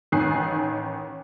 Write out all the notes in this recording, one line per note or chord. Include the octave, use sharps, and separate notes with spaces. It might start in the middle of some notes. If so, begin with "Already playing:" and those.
A1 D#3 G#5 D#6 F#6 C7